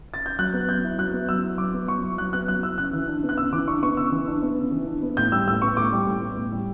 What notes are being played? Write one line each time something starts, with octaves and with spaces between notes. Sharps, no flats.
A6
G6
F#3 F#6
B3
F#3 G6
E4
F#3 F#6
B3
F#3 E6
E4
F#3 D6
B3
F#3 C#6
E4
F#3 F#6
B3 F#6
F#3 F#6
E4 E6
C#3 F#6
E3
D4
B3
F#6
C#3 E6
E3 D6
D4 C#6
B3 C#6
C#3 E6
E3
D4
B3
C#3
E3
D4
B3
A2 G6
G3 E6
A2 E6
B3 C#6
A2 D6
G3
A2
B3
A2
G3